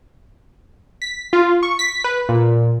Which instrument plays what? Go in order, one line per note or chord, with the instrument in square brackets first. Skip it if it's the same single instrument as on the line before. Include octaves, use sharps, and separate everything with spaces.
[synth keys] B6
F4
C#6
B6
B4
A#2